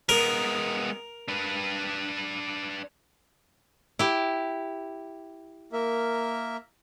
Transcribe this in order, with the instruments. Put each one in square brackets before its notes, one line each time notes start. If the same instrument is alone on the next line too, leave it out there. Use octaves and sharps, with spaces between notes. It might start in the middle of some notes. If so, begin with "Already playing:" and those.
[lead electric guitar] G#3 B3 [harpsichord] A#4
[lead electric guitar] D4 B4
[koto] E4 G4
[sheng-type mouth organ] A#3 A#4 E5